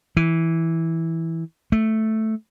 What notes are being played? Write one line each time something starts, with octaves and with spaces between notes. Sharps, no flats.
E3
A3